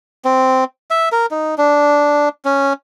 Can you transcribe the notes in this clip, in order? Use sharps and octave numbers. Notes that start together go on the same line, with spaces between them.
C4
E5
A#4
D#4
D4
C#4